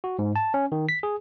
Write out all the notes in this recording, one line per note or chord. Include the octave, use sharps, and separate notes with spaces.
F#4
G#2
A5
C#4
D#3
B6
G#4